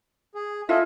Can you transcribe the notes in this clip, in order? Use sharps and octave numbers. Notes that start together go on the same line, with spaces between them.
G#4
E4 F4 A4 D#5 E5